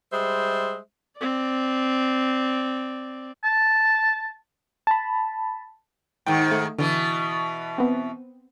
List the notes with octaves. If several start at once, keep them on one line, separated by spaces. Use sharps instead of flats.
G3 G#3 C5 E5
C4 D5
A5
A5 B5
G#2 D#3 G5
A3
B2 D3 E3
B3 C4